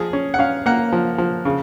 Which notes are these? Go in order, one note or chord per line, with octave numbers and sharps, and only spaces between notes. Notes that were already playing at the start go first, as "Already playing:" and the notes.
Already playing: F3 G#4
C#4
F#5
C#4 F5
A#3 F#5
F3
F3
C#3